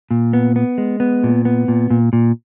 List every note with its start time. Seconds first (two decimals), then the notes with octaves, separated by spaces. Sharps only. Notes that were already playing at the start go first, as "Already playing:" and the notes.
0.11 A#2
0.33 B3
0.56 B3
0.78 G#3
1.00 B3
1.23 A#2
1.45 B3
1.68 A#2
1.90 A#2
2.13 A#2